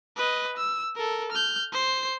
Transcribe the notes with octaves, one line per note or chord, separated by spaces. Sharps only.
B4 D#5
E6
A4 A#4
F6 G6
C5 C7